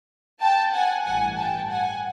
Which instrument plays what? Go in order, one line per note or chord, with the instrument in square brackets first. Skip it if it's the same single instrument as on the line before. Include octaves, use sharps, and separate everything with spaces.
[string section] G5 A5
F#5 G#5
A1 G2 E3 F#5 G#5
G5 A5
F#5 G#5